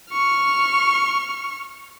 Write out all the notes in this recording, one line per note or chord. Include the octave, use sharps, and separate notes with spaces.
C#6 F6